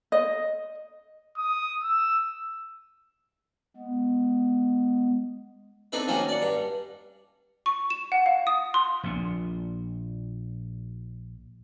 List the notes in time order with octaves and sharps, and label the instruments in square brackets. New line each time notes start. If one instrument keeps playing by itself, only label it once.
[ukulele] D#5
[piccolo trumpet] D#6
E6
[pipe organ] G#3 B3
[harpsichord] C4 D4 D#4 A4 B4
D#3 F3 A#3 C#4 F#4
D5 F#5
G2
[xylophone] C#6
E7
F#5
F5
D#6
C6
[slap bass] A#1 A#2